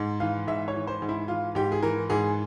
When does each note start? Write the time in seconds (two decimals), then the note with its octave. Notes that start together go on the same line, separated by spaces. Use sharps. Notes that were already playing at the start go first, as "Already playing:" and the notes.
Already playing: G#2
0.20 E3 F5
0.47 G#2 E5
0.68 C#5
0.74 E3
0.87 C5
1.02 G#2
1.09 E4
1.28 E3 F4
1.55 G#2 G4
1.72 G#4
1.83 E3 A#4
2.10 G#2 G#4